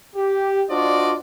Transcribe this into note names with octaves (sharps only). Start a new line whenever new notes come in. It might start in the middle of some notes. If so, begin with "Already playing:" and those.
G4
D4 F4 F#4 C5 D5 D#5